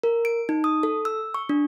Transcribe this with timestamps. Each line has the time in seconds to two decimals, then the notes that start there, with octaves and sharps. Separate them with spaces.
0.04 A#4
0.25 D7
0.49 D#4
0.64 D#6
0.83 A4
1.05 E6
1.34 C#6
1.49 D4